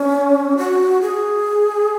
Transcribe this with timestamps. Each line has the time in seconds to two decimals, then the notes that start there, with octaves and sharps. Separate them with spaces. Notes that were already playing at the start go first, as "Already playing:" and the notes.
Already playing: C#4
0.57 F#4
1.01 G#4